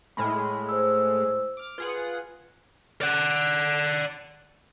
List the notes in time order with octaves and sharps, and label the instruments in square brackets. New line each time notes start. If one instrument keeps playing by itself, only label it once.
[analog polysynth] A2 G#3 A3 [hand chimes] B5 F6
[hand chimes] C5 E6
[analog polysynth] D6 F6
[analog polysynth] F4 G#4 F#5 [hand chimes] B4
[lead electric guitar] D5 F#5